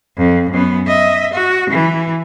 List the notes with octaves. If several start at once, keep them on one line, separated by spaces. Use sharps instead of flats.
F2
F#2 B3
D#5 E5
F#4
E3